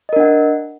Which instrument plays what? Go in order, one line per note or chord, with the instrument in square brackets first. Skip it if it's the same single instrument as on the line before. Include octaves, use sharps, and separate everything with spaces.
[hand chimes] D#5
A#4
D4
F#5